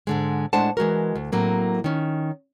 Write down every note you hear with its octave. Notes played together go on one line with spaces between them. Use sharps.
G#2 D3 G#3
A2 G#3 D4 C5 F#5 A5
E3 G#3 F#4 A#4
D2
A2 F#3 A#3 C4
D#3 C#4